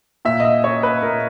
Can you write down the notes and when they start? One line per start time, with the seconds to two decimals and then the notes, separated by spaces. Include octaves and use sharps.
0.25 A#2 E5
0.40 D#5
0.45 E5
0.64 A#3 C#4 C#5
0.83 B4
1.02 A#2 A#4